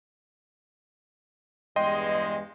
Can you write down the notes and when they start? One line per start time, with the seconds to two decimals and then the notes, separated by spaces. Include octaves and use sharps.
1.76 E2 G2 G#3 D#5 G5 C6